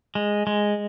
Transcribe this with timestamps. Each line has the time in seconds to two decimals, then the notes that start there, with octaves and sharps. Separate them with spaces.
0.15 G#3
0.47 G#3